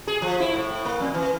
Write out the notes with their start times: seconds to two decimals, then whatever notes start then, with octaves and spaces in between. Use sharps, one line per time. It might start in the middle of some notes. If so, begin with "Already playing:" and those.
0.07 G#4
0.22 F3
0.40 E4
0.54 A2
0.85 A#3
1.00 F2
1.14 E3